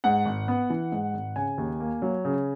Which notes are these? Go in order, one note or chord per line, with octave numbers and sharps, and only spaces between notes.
G#2 F#5
G#1
B3
E3
G#2
G#1
C#3 G#5
D#2
A#3
F#3
C#3